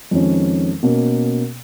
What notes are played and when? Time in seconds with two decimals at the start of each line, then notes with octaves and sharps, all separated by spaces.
0.11 F2 D#3 G#3 C#4
0.83 B2 A#3 C#4